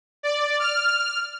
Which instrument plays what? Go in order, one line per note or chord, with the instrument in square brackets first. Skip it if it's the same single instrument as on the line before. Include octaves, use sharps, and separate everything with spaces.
[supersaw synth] D5
F6